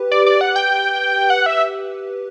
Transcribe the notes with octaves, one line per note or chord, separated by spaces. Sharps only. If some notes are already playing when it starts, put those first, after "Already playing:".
Already playing: G4 B4
D5
D5
F#5
G5
F#5
E5